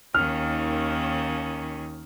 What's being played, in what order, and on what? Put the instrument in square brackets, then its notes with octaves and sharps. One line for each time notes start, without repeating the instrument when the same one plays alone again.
[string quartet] D#2 D#3 C#4 [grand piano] F6